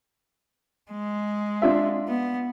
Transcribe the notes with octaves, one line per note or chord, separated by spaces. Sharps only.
G#3
D4 F4 E5
B3